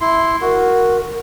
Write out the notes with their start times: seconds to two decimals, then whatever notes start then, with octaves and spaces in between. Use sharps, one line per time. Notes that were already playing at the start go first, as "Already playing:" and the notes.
0.01 E4 C6
0.41 F#4 A#4